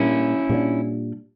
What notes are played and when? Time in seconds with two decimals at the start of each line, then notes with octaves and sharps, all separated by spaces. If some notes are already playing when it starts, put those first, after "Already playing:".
Already playing: A#2 G3 A#3 C#4 D4 E4
0.49 A#2 G3 A#3 D4